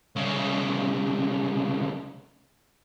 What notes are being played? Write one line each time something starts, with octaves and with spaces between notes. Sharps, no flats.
C2 C#3